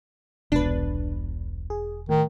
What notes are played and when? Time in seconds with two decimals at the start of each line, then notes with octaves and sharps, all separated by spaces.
0.52 E1 C2 B2 D4 B4
1.70 G#4
2.09 A2 D#3